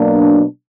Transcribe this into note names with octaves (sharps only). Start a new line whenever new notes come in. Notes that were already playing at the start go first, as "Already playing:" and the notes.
Already playing: B2 F#3 A#3 D4